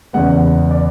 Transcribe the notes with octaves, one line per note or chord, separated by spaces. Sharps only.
E2 C#3 G#3 B3 F#5
D5